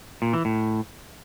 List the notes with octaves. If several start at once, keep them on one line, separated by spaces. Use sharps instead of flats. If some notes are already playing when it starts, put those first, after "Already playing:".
A#2
E3
A2